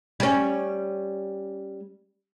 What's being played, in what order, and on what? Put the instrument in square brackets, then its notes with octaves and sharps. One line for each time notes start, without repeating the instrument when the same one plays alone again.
[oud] G3 C#4